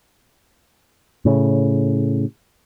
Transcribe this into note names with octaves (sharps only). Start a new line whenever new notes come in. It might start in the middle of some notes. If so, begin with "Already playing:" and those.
A2 C#3